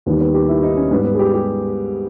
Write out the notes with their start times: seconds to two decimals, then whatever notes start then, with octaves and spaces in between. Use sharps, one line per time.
0.06 D#2 D#3 G3 B3
0.21 B3
0.34 G4
0.49 E4
0.63 D#4
0.77 C#4
0.91 G#2 G3 B3
1.04 B3
1.14 G#4
1.19 G4
1.34 G4